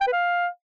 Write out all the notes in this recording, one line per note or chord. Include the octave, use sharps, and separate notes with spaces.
G5
B4
F5